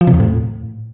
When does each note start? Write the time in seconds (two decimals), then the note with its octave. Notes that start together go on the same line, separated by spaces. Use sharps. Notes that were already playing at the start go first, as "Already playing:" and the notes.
0.01 F3
0.07 C3
0.14 E2
0.20 A2